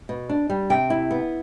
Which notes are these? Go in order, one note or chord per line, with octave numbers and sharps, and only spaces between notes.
B2
D4
G3
C3 G5
E4
B3